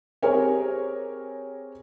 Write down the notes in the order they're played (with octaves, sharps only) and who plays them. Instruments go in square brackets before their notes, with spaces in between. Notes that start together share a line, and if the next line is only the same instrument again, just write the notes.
[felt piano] C4 G4 G#4 A#4 C#5 G#5